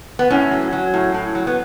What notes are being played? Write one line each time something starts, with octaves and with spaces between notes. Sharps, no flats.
B3
A2 C#4
F#3
F#3
A2
A2
F#3
B3